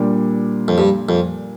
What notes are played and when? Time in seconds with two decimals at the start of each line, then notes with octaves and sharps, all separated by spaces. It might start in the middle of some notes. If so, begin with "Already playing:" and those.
Already playing: A#2 G3 D4
0.68 F2
0.78 G2
1.09 F2